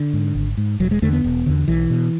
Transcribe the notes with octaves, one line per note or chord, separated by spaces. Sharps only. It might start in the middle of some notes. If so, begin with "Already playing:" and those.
Already playing: D3
G#2
G#1
G#2
E1 F#3
G#3
E2 D3 A3
B3
E1
E2 D3
B1 E3
B2